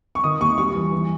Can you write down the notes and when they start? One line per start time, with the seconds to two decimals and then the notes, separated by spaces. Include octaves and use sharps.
0.15 C#6
0.24 D#3 D#6
0.41 D#2 C#6
0.58 G3 C#6
0.75 E3
0.92 E3